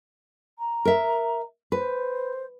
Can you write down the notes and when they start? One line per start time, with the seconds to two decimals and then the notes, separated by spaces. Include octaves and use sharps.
0.58 A#5
0.85 A#4 E5
1.72 B4 C5